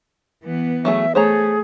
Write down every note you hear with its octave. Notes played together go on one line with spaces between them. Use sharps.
E3 B3
F#3 A3 G#4 E5
A3 G#4 C5 C#5 A#5